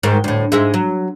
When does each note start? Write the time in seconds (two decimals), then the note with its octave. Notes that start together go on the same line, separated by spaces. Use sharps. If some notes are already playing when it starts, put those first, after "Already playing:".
0.03 G#2 D#3
0.24 D2 A2
0.52 G#2 G#3 E5
0.74 F#3